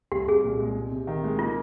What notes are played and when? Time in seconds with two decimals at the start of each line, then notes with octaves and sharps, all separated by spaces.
0.12 C2 G4
0.28 C2 G#4
0.44 A#2
0.60 G#3
0.76 C3
0.91 C3
1.07 D#3
1.24 G#3
1.39 A#3 F4